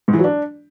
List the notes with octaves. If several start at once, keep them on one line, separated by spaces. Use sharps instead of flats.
G#2
E3
F#3
D4